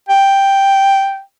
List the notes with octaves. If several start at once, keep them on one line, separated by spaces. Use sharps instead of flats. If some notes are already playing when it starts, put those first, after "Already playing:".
G5